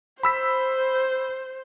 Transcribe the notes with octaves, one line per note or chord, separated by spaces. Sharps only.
C5 B5 E6 B6